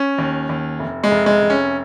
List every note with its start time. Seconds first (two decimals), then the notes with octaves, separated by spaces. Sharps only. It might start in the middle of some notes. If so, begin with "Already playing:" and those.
Already playing: C#4
0.18 D#2
0.49 D#2
0.79 F1
1.04 G#3
1.11 F1
1.26 G#3
1.42 F1
1.50 C#4